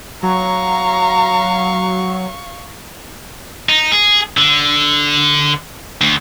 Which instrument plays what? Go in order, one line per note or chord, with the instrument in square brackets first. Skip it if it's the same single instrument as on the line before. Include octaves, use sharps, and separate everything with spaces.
[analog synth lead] F#3 [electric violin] F5 C#6 [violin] A#5
[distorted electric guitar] D#4
G#4
D3
D2